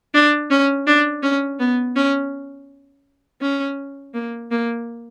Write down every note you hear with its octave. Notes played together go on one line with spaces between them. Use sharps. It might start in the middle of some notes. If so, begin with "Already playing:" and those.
D4
C#4
D4
C#4
B3
C#4
C#4
A#3
A#3